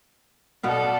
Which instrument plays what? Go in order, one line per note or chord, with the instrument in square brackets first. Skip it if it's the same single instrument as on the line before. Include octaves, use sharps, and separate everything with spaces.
[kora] B2 B3 F5 [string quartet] A4 D5